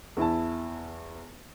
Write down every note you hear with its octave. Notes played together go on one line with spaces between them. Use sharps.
E2 E4 A5